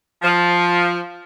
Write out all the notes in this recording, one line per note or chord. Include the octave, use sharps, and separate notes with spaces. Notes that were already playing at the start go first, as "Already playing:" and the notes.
F3